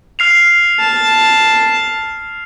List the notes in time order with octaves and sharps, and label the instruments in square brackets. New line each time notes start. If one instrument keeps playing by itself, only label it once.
[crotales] F6 C7 F7
[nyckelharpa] A5